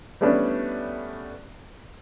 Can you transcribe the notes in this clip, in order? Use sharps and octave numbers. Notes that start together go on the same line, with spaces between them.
G3 A3 B3 C#4 D4 E4